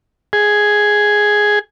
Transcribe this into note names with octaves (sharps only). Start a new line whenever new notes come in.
G#4